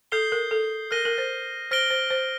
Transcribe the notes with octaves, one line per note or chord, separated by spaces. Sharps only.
A4 D#6 G6 C7 G7
A#4
A4
A#4 F6 A#6 D#7 G7
A#4
C5
C5 F6 A#6 D7 G7
C5
C5